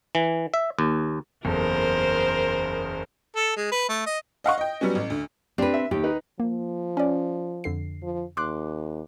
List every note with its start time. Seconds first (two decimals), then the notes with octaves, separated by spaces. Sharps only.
0.15 E3
0.54 E5
0.79 D#2
1.45 F#1 E2 A4 A#4 C5
3.36 A4
3.56 G#3
3.71 B4
3.89 A3
4.06 D#5
4.44 D#5 F5 F#5 C#6
4.58 D#5 G5
4.81 F#3 G3 B3 C#4
4.95 A1
5.10 D2
5.58 C4 D4 G4 B4
5.74 E5
5.91 D#2 G4
6.04 D#4 B4
6.40 F3 A#3
6.97 C#4 D5
7.64 F2 D3 C7
8.03 F3
8.37 D#2 C6 D6 F#6